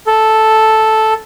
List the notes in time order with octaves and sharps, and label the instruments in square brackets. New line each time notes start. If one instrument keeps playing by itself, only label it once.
[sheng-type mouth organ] A4